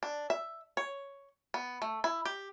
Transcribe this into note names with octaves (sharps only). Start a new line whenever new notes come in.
D4
E5
C#5
B3
A3
E4
G4